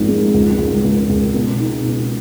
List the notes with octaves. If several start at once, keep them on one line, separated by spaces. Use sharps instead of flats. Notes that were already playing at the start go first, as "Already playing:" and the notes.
Already playing: G#1 G#2 F3
G#3
C#2
C#2
C#2
C#2
B2
D#4
B2